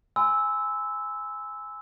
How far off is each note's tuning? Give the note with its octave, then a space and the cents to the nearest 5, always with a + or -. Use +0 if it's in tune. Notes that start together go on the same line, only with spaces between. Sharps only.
G#5 +0 C6 -40 E6 -10